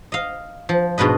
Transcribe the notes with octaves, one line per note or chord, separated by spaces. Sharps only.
D#5 F5
F3
G#2 B2 D4 B4 D#5